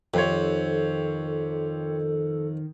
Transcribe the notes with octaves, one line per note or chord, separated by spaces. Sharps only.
F2 D#3 G4 A4 C5 C#5